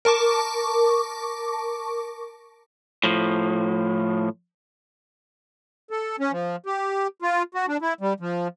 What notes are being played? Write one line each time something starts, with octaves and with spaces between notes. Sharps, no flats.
A#4 A5 C#6 D6
A2 F3
A4
C#4
F3
G4
F4
F#4
D4
E4
G3
F3